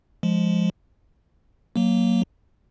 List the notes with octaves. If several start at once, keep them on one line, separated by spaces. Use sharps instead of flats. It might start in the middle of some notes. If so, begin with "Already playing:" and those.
F3 G#3
F#3 A#3